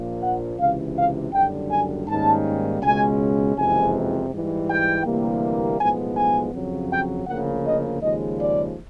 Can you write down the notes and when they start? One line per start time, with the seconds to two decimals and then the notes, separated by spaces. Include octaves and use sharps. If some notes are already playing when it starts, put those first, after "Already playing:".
Already playing: A#1 A#2 F3 A#3
0.21 F#5
0.58 C#2 C3 E3 F5
0.95 F5
1.33 F#1 F#2 D3 G3 G5
1.70 G#5
2.07 G#2 D#3 G3 A#3 C#4 A5
2.81 C#2 B2 G#3 C#4 G#5
3.56 F#1 F2 C3 E3 G#3 G#5
4.30 G#2 E3 G3
4.68 G5
5.05 D2 C3 E3 G3 A#3
5.78 B1 A2 F3 G#3 B3 G#5
6.15 G#5
6.53 F2 C#3 F#3
6.91 G5
7.27 D2 C#3 F3 A#3 F#5
7.64 D#5
8.02 D#2 C#3 F3 G#3 D#5
8.38 D5